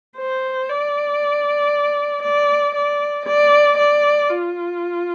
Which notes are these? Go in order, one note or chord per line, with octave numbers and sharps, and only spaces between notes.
C5
D5
D5
D5
D5
D5
F4